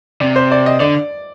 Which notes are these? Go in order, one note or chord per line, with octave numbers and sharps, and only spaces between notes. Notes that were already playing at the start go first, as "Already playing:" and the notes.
C3 D5
C5
D5
D#5
D3 D5